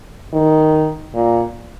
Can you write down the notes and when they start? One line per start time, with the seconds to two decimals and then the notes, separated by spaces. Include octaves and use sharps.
0.33 D#3
1.14 A#2